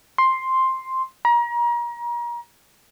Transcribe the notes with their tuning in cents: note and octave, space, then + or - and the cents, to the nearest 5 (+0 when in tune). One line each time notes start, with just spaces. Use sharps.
C6 +5
A#5 +35